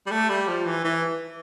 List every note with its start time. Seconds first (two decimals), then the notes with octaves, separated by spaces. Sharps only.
0.06 G3
0.11 A3
0.29 G3
0.48 F3
0.66 E3
0.84 E3